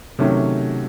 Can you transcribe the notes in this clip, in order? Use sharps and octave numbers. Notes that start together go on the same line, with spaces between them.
C3 D#3 F#3 A3 C#4